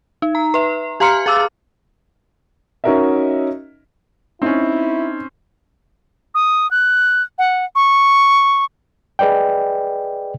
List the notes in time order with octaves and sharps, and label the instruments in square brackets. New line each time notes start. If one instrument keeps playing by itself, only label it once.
[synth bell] D#4
A#5
B4 E5
G4 F5 A#5 C6 F6 C#7
G#4 F5 D6 E6 A6
[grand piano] C#4 D#4 F#4 A#4 D#5 E5
[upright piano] C4 C#4 [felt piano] D#4 [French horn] E4
[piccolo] D#6
F#6
F#5
C#6
[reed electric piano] G#4 B4 D5 D#5 G5